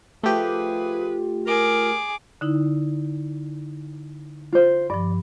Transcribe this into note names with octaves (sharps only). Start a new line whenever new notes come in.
F3 A3 F4 G4 G#4 B4
G#4 A#4 D6
D3 D#4 E4
F4 C5
G2 F3 D5